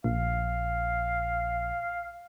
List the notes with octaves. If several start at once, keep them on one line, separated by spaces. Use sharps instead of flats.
A#1 F5